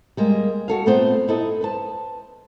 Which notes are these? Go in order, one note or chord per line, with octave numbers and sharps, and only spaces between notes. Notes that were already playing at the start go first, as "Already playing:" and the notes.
G3 G#3 A#3
F#4 A4 F5
A#2 A3 B3 C4 C5
D#4 E4 A4 D#5
B4 C5 A5